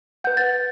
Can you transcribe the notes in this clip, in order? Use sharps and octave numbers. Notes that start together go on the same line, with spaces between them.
B4 F#5 G6
A6